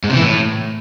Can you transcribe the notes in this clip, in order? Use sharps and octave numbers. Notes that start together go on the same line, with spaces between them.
G#2
C3
E3
A2